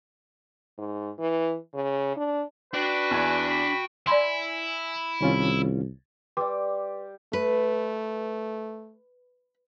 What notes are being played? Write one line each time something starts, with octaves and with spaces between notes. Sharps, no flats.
G#2
E3
C#3
D4
D4 F#4 B4 D5 G5
E2 G#5
B5
E4 D5 G#5 B5 C6
C2 D#3 C#4 F4
G3 G4 B4 C6 D6
A3 B4